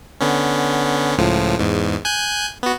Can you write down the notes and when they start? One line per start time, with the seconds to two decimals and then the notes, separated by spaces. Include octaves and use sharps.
0.21 D3 B3 C#4
1.18 C#2 A2 F3
1.59 E2 G#2
2.05 G#5 F#6 G6
2.63 B3 F#4